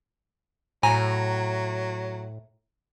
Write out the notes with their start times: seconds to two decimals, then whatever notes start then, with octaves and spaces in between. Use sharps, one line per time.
0.83 A2 F#3 G#5 A#5